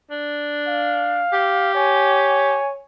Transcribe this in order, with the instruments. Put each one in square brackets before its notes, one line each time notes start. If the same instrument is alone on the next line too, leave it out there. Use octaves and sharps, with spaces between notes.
[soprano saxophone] D4
[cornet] F5
[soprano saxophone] G4
[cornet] C#5 [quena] G#5